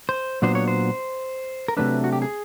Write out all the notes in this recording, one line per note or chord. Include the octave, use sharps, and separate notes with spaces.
C5
A#2 F#3 B3 D4 C5
C#5
C5
A#4
C3 D#3 F#3 A3 D4 B4
F#4
G4
G#4